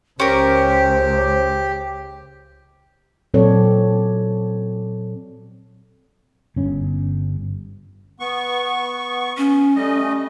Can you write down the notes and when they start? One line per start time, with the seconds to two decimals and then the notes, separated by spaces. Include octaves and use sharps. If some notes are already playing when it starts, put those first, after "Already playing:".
0.20 C#2 C#4 G4 A#4 C5
3.34 A#2 F#3 C4 A4 C#5 D5
6.56 G1 C#4
8.20 B3 C#6
9.37 C#4
9.76 G3 A3 D#5